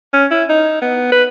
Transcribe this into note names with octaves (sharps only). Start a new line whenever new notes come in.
C#4
E4
D#4
B3
B4